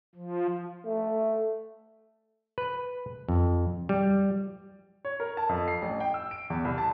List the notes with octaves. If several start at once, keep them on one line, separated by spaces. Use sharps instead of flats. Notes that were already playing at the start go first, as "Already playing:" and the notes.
F3
A3
B4
F2
G3
C#5
A#4
A5
F2
C7
A1
G5
E6
D7
E2
C2
A5